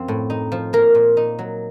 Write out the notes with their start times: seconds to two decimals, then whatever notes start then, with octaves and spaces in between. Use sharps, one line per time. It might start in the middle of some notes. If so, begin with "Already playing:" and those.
Already playing: F#2 F3 C4
0.08 A2
0.30 D#4
0.52 F3
0.73 A#3 A#4
0.95 A#2
1.17 D#4
1.39 F#3